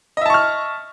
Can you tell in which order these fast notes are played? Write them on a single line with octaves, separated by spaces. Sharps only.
D#5 E5 A5 C#6 F6